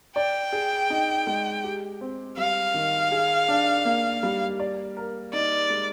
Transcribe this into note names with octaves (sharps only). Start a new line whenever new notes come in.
D5 G5
G#4
D#4
G#3
G4
C4
G3 F5
D#3
G#4
D4
A#3
G3
D5
A#4
D#4 D5
G#3